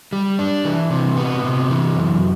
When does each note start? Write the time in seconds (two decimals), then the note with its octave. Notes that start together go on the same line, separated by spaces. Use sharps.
0.13 G3
0.39 D4
0.65 E3
0.91 C3
1.17 B3
1.44 C3
1.70 E3
1.96 F#2